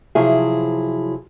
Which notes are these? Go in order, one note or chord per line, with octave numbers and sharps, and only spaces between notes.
C3 F3 F#3 E4 G#4